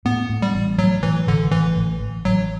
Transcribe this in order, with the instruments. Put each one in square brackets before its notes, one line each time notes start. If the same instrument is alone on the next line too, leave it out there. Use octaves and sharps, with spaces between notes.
[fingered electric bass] A2 [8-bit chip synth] B3
[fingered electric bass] A2
[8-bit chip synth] G3
[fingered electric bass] A1
[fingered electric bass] A2 [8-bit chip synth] F#3
[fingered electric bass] A2 [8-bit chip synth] E3
[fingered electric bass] A1 [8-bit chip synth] D3
[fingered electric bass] A1 [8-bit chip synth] E3
[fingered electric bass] A1
A1
[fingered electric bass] A1 [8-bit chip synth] F#3